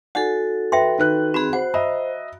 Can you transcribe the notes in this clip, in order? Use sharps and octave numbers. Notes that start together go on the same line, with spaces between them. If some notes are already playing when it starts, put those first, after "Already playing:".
D#4 F#4 A4 D5 F#5
B4 E5 G5 C6
D#3 B4 F#6
C4 F#4 G#4 B5
F#4 C5 F#5
D#5 E5 A#5 B5